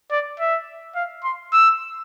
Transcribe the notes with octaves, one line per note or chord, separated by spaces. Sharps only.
D5
E5
F5
C6
E6